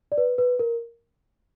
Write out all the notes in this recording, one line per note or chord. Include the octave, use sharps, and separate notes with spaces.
D5
B4
B4
A#4